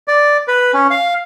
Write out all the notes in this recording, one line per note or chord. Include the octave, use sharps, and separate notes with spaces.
D5
B4
C#4
F5